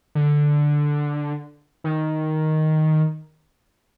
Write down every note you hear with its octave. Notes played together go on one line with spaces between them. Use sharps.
D3
D#3